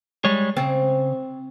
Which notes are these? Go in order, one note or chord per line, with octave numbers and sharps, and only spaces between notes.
G3 G#3 C#5
C#3 C4